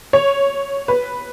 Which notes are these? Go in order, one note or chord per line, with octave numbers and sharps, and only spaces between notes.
C#5
B4